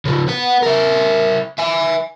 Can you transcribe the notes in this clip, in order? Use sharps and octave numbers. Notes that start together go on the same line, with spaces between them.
C#3 F3
B4 F#5
E4 A#4
E5 G#5